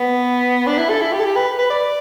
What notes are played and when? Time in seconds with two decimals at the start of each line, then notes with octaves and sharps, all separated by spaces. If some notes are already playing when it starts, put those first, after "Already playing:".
Already playing: B3
0.67 D4
0.78 E4
0.90 A4
1.01 E4
1.13 G4
1.19 A4
1.24 G4
1.36 B4
1.59 B4
1.70 D5